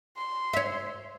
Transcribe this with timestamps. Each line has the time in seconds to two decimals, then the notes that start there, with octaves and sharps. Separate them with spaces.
0.17 C6
0.53 C#5 E5